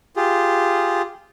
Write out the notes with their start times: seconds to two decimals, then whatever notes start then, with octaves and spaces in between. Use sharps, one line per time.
0.16 F4 G4 G#4